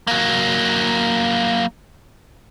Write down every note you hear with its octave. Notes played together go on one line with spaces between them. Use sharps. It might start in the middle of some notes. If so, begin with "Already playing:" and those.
F#3 A#3